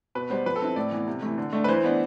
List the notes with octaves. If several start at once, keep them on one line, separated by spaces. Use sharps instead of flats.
B2 B4
G3 B3 C5
F3 B4
A4
C4 E4
A2 D5
E3 B3
C3
E3 A3
D3
A3 D4
B4
E3 C5
B3 D4